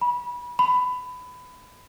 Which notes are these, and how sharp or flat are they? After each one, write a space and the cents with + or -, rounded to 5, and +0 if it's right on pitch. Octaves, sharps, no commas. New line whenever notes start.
B5 -25
B5 +20